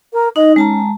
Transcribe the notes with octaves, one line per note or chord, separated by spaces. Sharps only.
A#4
D#4 D#5
G#3 C#4 A5 A#5